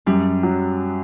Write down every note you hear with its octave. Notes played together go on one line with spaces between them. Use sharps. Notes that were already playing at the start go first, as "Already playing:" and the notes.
F#2 G3
F#3